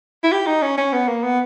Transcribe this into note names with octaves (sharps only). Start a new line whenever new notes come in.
E4
G4
D#4
C#4
C#4
B3
A#3
B3